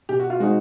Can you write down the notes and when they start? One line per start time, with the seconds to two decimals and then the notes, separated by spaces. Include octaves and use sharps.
0.09 B2 G4
0.20 F#4
0.30 F4
0.40 G#3 C4 D#4 F#4